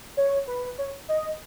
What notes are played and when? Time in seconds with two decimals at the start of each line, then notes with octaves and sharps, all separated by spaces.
0.17 C#5
0.47 B4
0.78 C#5
1.09 D#5